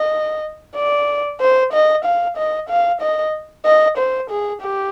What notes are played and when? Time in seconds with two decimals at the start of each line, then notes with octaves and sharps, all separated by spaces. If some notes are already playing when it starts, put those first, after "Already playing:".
Already playing: D#5
0.76 D5
1.40 C5
1.73 D#5
2.05 F5
2.37 D#5
2.69 F5
3.01 D#5
3.65 D#5
3.98 C5
4.30 G#4
4.61 G4